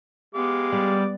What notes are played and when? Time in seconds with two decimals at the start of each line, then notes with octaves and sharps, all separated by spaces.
0.35 G#3 B3 G4 F5 D6
0.72 G3